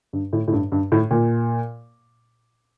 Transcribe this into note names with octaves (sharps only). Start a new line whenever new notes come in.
G2
A2
A2
G2
G2
A2
A#2